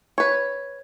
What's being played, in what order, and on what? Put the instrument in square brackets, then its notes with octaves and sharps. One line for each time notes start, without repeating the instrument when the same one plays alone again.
[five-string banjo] B4 C#5